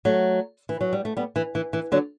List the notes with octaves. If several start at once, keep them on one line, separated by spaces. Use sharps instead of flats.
F#3 A3
E3
F#3
G3
A3
G3 B3
E3
E3
E3
D3 F#3